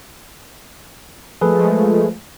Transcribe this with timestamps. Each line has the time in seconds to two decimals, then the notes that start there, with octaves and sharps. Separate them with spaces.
1.41 F3 G#3 A3 G#4 A4 B4